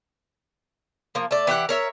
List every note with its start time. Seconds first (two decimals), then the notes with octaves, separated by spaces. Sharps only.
1.15 F3 A#3
1.31 A3 D5
1.47 E3 G4 C#5 F#5
1.69 A#4 C#5 E5